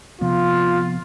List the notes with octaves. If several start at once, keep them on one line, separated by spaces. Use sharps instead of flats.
C3 F3 B3 F4